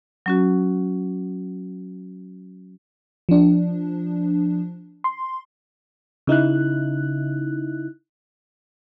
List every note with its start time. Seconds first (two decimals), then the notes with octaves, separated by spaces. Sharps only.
0.26 F#3 C#4 F#4
3.29 F3 D4
5.04 C6
6.27 C#3 D#4 E4 F#6